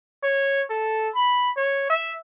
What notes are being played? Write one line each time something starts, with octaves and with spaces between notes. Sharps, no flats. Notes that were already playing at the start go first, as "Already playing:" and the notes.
C#5
A4
B5
C#5
E5